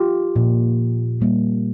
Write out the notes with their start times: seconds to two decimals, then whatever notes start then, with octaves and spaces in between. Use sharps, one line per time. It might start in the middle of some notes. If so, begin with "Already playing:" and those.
Already playing: F4 G4
0.36 A#2 F3 A#3
1.20 A#2 G3 A#3